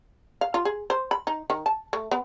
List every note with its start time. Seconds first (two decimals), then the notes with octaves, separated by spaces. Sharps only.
0.41 F5
0.54 F4
0.65 G#4
0.90 C5
1.11 B5
1.27 D#4
1.50 D#3
1.66 A5
1.93 A3
2.11 B3